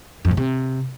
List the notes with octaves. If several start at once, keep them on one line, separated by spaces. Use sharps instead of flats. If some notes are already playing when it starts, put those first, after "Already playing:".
F2
A#2
C3